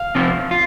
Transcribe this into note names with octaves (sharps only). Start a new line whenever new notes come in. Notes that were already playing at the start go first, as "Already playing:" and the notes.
Already playing: F5
C3 F3 C4 F4
F4